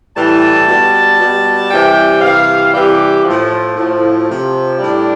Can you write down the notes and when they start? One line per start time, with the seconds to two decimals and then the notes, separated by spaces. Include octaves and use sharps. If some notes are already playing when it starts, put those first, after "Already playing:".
0.16 A2 E3 G3 A5
0.68 B2 G3
1.19 B2 G3
1.70 C3 E3 G3 G5
2.22 C3 E3 G3 F5
2.74 C3 E3 G3 G4
3.24 A2 F3
3.77 A2 F3
4.27 C3 F3
4.78 A2 G3 D4